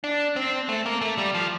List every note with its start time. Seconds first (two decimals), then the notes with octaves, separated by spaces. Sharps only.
0.04 D4
0.36 C4
0.69 A3
0.86 A#3
1.01 A3
1.18 G3
1.34 F3